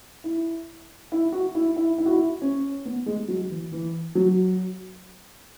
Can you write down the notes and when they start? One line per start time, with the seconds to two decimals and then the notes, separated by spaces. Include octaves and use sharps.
0.24 E4
1.12 E4
1.32 F#4
1.55 E4
1.76 E4
1.98 E4
2.06 F#4
2.13 E4
2.42 C#4
2.85 B3
3.06 G#3
3.28 F#3
3.50 E3
3.72 E3
4.15 F#3